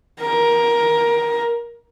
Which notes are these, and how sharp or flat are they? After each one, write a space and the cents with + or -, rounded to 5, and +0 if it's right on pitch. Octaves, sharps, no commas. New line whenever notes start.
A#4 +15